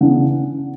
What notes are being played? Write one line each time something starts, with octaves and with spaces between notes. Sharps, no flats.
C#3 E3 B3 D4 F#5